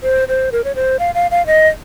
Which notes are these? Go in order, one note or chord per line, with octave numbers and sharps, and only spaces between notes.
C5
C5
A#4
C#5
C5
F5
F5
F5
D#5